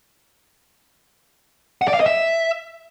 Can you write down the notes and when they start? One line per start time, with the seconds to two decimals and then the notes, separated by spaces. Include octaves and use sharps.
1.82 F#5
1.88 D5
1.94 F5
2.00 D#5
2.06 E5